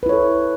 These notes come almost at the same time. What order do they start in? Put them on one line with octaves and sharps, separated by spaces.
B4 E4 C#5 A4